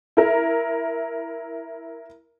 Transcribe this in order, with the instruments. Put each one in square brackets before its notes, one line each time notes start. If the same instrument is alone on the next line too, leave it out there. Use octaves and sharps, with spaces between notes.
[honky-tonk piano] E4 A#4